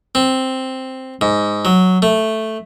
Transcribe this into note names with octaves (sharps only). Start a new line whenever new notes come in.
C4
G#2
F#3
A3